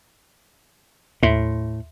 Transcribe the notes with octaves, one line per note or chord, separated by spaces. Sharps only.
D#2 A2 E5 C6